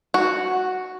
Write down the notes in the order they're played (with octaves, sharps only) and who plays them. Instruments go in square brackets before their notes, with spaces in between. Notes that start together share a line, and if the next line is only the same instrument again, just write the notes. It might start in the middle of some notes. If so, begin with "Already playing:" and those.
[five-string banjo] F#4